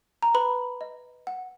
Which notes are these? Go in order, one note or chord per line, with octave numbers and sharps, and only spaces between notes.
A#5
B4 B5
D#5
F#5